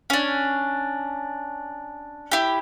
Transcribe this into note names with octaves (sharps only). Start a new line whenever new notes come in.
C#4 D4
E4 G4